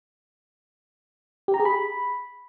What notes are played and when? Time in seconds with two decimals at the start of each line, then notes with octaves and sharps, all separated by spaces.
1.48 G4
1.54 A#5
1.60 G#4
1.65 B5